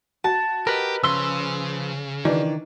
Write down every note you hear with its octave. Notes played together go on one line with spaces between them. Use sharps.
F#4 A5
G4 A#4 B4 D#5
C#3 F3 B4 C6 E6
D#3 E3 D4